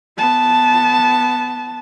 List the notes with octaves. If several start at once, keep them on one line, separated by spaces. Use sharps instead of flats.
B3 A5